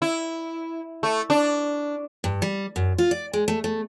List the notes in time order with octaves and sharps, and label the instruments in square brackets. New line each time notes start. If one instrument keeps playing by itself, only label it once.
[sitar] E4
A3
D4
[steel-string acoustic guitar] G2
G3
F#2
F4
D5
G#3
A3
A3